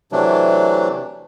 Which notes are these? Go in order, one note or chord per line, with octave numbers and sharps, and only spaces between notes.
C3 E3 F#3 A3 D4